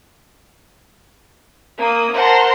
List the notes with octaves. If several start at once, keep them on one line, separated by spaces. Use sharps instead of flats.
A#3 D#6
A#4 C5 F#5 A5 A#5 C6